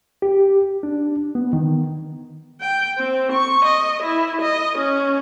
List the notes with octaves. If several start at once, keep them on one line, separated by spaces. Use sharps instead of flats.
G4
D4
B3
D#3
G5
C4
C#6
D#5
E4
D#5
C#4